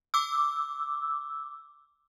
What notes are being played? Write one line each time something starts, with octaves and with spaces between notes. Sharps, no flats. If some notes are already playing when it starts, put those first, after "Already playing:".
D6 E6